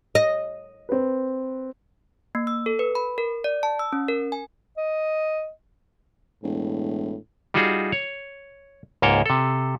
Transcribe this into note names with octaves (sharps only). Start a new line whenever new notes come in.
D#5
C4 B4
A#3
E6
A4
B4
B5
A#4
D5
A5
E6
C#4
A#4
G#5
D#5
E1 A2
G3 D#4 F4 F#4 G#4
C#5
C#2 G#2 A#3 C#5 G5 A5
C3 A4